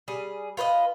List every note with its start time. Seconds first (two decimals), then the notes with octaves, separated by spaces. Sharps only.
0.08 G3 G#4
0.57 F4 B4 C5 D#5